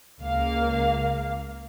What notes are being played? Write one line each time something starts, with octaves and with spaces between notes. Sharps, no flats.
C#2 A#3 F5